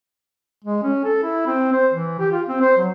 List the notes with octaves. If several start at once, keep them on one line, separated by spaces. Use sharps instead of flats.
G#3
C#4
A4
E4
C4
C5
E3
G4
F4
C4
C5
F#3